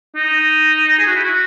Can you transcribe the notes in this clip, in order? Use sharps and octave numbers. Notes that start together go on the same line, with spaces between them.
D#4
G#4
F#4
E4
F#4